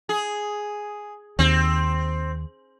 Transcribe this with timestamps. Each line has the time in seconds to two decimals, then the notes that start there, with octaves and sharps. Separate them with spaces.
0.09 G#4
1.39 D#2 C4